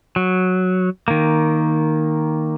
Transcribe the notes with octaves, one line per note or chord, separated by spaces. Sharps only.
F#3
D#3 A#3